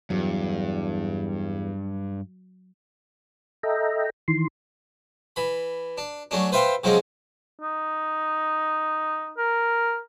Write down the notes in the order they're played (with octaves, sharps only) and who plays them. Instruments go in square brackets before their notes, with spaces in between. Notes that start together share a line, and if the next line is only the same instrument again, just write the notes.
[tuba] E2 [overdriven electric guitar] G2 [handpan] F#3
[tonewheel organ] A4 D#5 E5 G5 A#5
D#3 E3 C6
[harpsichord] E3 B5
D4
F#3 A3 C#4 D4
B4 C5 E5 F5 G5 C6
C3 F3 F#3 G#3 C4 C#4
[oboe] D#4
A#4